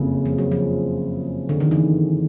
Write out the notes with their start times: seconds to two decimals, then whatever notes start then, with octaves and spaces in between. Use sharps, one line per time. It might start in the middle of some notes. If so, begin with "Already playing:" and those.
Already playing: F#1 F2 C#3
0.25 F3
0.38 F#3
0.52 F3
1.49 D3
1.60 D#3
1.71 E3